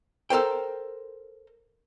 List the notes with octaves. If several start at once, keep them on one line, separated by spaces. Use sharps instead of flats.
A4 A#4 C5 G5